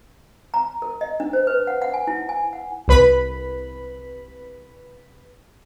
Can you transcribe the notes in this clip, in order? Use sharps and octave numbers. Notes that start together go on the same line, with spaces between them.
A#5
A#4
D#5
D4
C5
B4
F#5
F#5
G#5
E4
G#5
F#5
C2 B4 B5